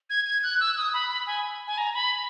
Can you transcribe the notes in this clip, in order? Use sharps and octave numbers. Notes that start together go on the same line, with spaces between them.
G#6
G#6
F#6
E6
D#6
B5
B5
G#5
G#5
A#5
B5